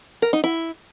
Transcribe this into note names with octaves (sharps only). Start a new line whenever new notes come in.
A#4
D#4
E4